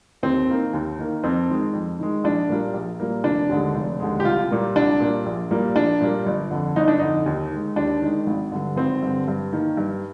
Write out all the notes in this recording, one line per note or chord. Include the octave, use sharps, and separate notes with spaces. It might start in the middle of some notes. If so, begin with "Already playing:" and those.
D#2 C4
D#3 A#3
D#2
D#3 A#3
F2 C4
D#3 G#3
F2
D#3 G#3
A#1 D4
A#2 G3 A#3
A#1
A#2 G3 A#3
F1 D4
D#2 D3 G#3
F1
D#2 D3 G#3
G4
C2 F4
A#2 G3 A#3
C2 D4
A#2 G3 A#3
A#1
A#2 G3 A#3
A#1 D4
A#2 G3 A#3
G1
F2 D3
G1 D#4
D4
F2 D3 D#4
D#2
D#3 G#3
D#2 D4
D#3 G#3
G#1
G2 D3
G#1 C4
G2 D3
G2
D#3 A#3
G2